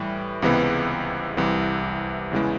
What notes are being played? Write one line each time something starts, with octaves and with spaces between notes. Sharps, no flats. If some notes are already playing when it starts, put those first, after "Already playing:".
Already playing: A2 E3 G3
C#2 C3 E3 G#3 B3
C2 C3 E3
E2 C#3 E3 G#3